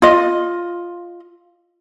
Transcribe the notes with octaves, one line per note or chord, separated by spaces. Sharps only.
F4 D#5